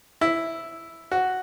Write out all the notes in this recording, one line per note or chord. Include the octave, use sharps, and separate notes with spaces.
E4
F#4